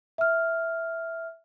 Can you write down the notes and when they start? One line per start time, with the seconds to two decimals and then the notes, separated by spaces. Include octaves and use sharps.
0.18 E5 F6